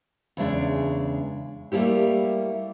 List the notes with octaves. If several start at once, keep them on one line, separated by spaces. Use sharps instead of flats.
E2 C#3 G#3 D4
G3 A3 A#3 E4 G4